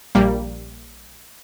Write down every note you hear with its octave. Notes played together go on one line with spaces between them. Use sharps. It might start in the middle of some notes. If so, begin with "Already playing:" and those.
A#1 G3 A#3